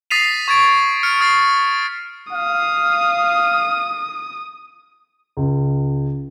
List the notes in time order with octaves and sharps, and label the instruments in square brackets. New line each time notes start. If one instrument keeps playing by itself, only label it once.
[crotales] D#6 A6 B6 C7 D#7 F7
C#6 G#6 A6 D7
F6 C#7
D#6 F6 A6 C7
[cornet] F5 [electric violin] D#6
[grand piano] C#2